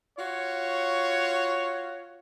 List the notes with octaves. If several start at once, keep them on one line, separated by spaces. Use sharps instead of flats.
F4 F#4 C#5